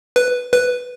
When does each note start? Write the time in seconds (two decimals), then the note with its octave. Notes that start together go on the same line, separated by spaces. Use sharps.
0.16 B4
0.53 B4